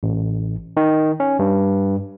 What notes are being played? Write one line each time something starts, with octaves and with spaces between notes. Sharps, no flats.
A1
D#3
C#4
G2